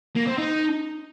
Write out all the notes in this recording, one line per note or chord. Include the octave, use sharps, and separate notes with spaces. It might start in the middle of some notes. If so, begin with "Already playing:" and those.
A#3
C4
D#4